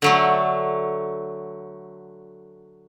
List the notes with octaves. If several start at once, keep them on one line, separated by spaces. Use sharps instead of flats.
D3 F#3 A3